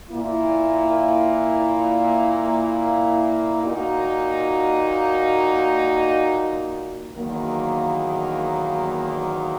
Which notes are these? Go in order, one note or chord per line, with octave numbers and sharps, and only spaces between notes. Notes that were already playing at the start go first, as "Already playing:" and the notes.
A#2 A#3 E4
A#2 A#3 D#4 F#4
E2 D#3 F#3 A#3